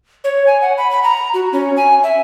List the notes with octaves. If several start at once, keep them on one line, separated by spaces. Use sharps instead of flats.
C#5
G#5
F#5
B5
B5
A#5
F#4
C#4
G#5
E5